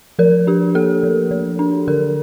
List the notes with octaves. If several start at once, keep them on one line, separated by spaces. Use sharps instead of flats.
F3 A#4
D4 G4
A#3 A4
F3
F3
D4
D3 A#4